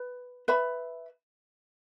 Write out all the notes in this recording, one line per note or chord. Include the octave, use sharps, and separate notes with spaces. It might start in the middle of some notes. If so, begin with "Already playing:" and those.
Already playing: B4
B4 E5 B5